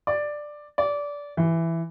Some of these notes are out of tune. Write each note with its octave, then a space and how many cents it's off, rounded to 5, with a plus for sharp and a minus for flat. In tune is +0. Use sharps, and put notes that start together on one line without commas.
D5 +10
D5 -20
E3 +5